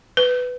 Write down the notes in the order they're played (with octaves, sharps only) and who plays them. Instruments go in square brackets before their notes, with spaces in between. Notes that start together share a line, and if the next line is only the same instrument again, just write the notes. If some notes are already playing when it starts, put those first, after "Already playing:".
[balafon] B4